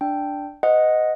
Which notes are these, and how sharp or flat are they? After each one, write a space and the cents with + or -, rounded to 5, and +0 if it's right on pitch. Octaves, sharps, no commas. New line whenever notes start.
D4 +0 G5 +0
B4 +45 D#5 +0 F#5 -10